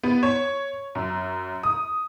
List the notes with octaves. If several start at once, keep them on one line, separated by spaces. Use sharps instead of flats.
B3
C#5
F#2
D#6